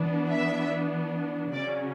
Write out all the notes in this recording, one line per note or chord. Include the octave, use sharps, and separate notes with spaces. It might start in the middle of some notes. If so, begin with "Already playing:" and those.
Already playing: E3 B3 D4
E5
C#3 F#3 C#4 D5